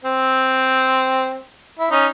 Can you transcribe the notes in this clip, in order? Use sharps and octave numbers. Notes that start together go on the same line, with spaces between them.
C4
E4
C#4 D#4